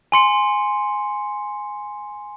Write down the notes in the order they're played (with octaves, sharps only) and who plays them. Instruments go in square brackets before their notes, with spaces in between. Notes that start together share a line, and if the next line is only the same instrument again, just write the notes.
[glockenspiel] G#5 C6 C#7